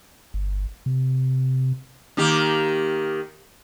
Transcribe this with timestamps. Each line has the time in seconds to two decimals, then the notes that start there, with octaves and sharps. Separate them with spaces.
0.34 G1
0.86 C3
2.17 D#3 A#3 G4